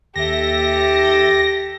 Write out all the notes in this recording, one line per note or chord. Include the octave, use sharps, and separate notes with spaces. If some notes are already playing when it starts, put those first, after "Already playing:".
D#2 G4 A4 E5 A#6